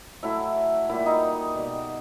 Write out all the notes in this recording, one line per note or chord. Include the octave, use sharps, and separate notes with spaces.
A2 F#3 A3 E4 E5
A#2 G3 E4 E5
D#4 D#5
B2 G3